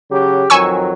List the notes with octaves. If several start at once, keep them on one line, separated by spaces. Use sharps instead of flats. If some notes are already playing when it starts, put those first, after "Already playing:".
C#3 F#3 G4
F2 D#3 F#3 G#5 C#6 E6